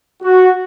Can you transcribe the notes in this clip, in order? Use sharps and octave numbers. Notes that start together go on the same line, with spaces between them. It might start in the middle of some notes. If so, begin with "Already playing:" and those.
F#4